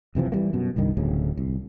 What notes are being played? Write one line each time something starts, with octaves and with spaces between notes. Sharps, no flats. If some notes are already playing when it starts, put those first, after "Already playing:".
F#1 C3 E3 F3
E3 G3 A#3
F#2 B2
F1 C2 G2 D#3
D1 D2 C#3
C2